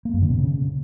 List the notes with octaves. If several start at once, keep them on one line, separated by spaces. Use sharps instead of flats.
A#3
F#2
D3
B2
C#3